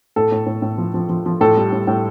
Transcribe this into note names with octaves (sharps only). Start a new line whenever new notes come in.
A2 A4
A2
A2
A2
F3
F3
F3
F3
A2 A4
G3
A2
A2